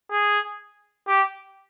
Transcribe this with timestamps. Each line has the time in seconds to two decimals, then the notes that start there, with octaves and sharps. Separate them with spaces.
0.11 G#4
1.08 G4